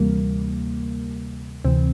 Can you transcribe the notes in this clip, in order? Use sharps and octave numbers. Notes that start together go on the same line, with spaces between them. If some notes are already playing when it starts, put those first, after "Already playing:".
Already playing: D2 C3 E3 G3 A#3
D2 C3 E3 C4